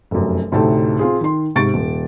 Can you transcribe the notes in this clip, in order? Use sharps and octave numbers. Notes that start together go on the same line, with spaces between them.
F1 F#2
D2 A2 C3 D#4 A4 A5
C4 F4 G#4
D#3 C6
G#2 C3 C#6 A6 D7
D#1